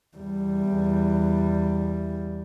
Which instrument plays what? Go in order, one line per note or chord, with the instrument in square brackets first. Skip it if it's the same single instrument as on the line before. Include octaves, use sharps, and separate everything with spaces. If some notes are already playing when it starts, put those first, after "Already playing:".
[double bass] E2 G3